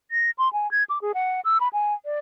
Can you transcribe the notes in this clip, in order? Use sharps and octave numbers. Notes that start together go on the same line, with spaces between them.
A#6
C6
G#5
G#6
D6
G#4
F#5
E6
B5
G#5
D5